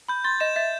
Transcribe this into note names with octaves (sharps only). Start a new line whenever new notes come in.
B5 G6
C6 A6
D#5 E7
E5 A6